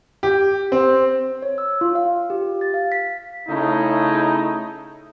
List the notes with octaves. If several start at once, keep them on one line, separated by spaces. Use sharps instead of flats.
G4
C4
C#5
E6
F4
F5
G4
A6
F5
B6
C#3 A3 D#4 E4